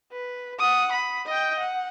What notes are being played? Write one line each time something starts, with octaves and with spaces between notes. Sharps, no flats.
B4
F#5 D#6
B5
D#5 G5
F#5